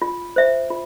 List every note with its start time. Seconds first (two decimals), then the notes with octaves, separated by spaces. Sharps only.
0.02 F4
0.36 C5 E5
0.70 F4